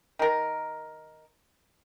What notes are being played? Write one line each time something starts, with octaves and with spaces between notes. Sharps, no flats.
D#3 A#4